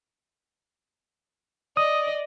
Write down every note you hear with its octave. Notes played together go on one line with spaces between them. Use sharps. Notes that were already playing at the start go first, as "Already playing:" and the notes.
D5 D#5 D#6